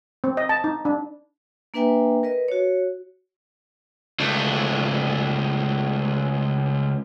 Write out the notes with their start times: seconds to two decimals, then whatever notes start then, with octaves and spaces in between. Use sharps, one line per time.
0.24 C4
0.37 D#5
0.49 A5
0.64 D#4
0.85 D4
1.74 A#3 D4 B4 E5 G5 G#5
2.23 A#4 B4 D#5
2.48 F#4 C#5
4.20 C#2 A3